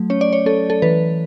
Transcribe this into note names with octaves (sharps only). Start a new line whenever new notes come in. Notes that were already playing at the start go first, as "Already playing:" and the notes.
Already playing: F#3 A3
C#4 C#5
D5
C#5
C#4 A4
A4
E3 B4